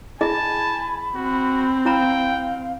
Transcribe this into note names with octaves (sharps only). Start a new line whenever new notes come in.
E4 G#4 D#5 G#5 A5 B5
C4 F#4
E4 F5 G5 A#5 B5